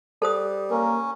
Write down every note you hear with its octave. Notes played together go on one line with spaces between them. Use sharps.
G3 A4 C5 D#6
A#3 C#4 A#4